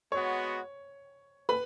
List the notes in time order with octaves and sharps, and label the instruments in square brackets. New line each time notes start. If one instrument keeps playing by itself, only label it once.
[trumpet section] G#3 B3 F#4 [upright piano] C#5 C#6
[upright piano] B4 B5